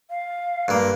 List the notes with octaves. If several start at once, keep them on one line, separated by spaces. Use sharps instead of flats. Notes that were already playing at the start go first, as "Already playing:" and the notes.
F5
G2 A#3